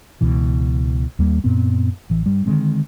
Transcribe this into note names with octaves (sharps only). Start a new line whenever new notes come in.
C#2 B2 E3
D#2 G3 A#3
F#2 A#2 B3 C4
A1 E3
G2 G3
D3 D#3 G#3 C4